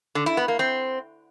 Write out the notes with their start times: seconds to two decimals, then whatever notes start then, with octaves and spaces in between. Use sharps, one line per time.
0.15 D3
0.26 E4
0.37 B3
0.48 A#3
0.59 C4